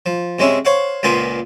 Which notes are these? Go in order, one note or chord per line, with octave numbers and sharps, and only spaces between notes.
F3
C3 G#3 C#4 E4
C5 C#5 F5 F#5
C#2 A#2 A#3 B3 C5 G#5